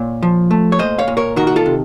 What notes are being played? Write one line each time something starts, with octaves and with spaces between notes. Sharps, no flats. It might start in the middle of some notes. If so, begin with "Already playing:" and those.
Already playing: A#2 C#5
F3
A3
C#5
A#2 C5 D#5
C#5 F5
A#2
A#4 C#5
D#3 F#4 A#4
F#4
F4 A4
C3